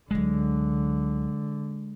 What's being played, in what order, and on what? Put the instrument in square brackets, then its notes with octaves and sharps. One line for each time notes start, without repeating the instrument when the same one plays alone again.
[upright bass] C#2 F#3 [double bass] D3 [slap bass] G#3